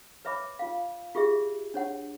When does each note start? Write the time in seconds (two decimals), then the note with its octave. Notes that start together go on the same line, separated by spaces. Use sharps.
0.25 B4 C#5 E5 B5 D6
0.59 F4 F5
1.15 F4 G4 G#4 E5
1.74 D4 C#5 F#5